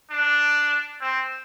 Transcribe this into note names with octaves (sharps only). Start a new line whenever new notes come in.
D4
C4